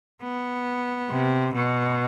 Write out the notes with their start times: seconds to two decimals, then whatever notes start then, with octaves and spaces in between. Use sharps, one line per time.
0.23 B3
1.10 C3
1.55 B2